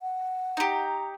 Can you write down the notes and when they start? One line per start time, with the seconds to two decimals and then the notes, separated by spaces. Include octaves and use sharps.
0.02 F#5
0.57 D#4 G4 A#5